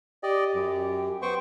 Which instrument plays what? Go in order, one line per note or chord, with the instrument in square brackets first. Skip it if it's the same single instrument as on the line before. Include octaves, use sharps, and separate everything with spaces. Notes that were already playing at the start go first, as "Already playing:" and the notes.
[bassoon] G4 [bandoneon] D5 D#5
[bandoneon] F#2
[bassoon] B3 [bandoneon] C5 G5 C#6